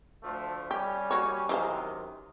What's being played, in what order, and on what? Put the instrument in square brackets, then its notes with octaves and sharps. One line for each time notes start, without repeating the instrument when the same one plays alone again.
[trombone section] D2 F3 A3
[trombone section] G3 C#4 [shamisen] G4
[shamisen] A#3 F#4 C#5
[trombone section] F#2 C3 D#3 [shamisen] E3 C5 F5